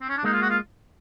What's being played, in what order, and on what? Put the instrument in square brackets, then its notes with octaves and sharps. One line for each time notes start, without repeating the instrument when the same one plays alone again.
[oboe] C4
C#4
D4
[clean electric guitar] G#3 A#3 [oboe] D#4
[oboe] F4
F#4
F4